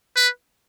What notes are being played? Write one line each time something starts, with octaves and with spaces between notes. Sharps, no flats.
B4